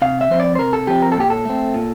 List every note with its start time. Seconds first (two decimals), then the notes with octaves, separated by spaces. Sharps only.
0.02 C3 F5
0.21 E5
0.30 F3 C4 C5
0.40 D5
0.55 C5
0.59 C3 A#4
0.73 A4
0.87 F3 C4 G4
1.02 A#4
1.12 A4
1.17 A#2 G4
1.30 A4
1.45 A3 C4
1.74 A#2